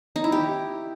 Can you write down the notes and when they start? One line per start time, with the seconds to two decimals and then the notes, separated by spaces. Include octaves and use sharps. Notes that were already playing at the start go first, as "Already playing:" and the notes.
0.16 D#4
0.24 E4
0.32 G4